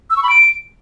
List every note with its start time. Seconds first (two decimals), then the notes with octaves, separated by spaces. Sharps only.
0.10 E6
0.17 C#6
0.23 B5
0.29 D7